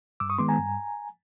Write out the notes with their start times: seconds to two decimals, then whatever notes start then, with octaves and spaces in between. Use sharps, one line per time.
0.20 G2 D6 E6
0.30 C#6 D#6
0.38 D#3 G#3 B3 C6 D6
0.48 G#5 A#5
0.58 G2